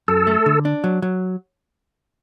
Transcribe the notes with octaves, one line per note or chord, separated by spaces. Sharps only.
F#2 A4
A3
D3
D4
F#3
F#3